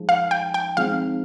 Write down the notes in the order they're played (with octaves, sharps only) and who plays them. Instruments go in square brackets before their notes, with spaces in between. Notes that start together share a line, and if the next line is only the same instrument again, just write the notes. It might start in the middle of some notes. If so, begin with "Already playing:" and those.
Already playing: [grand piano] F3 G#3 D#4
[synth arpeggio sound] F5
G5
G5
[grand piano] F3 G#3 C4 D#4 [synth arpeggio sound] F5